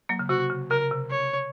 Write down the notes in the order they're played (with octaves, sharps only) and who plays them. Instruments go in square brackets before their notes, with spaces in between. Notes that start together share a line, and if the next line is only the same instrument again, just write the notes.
[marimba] F#3 A#3
C#3
[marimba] C3 [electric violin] F#4
[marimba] C#3
[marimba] C#3 [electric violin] A#4
[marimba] C3
[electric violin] C#5